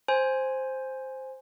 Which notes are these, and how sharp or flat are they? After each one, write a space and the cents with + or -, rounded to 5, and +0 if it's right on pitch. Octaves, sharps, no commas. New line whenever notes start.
C5 +0 G#5 +0